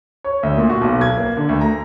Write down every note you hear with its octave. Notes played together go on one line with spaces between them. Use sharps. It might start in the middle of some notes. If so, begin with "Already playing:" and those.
C#5
D2
A#2
F#4
B1
G#6
A#3
D3
D2
A#5